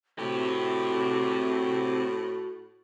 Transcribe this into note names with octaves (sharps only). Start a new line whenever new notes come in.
A2 C4 F#4 G4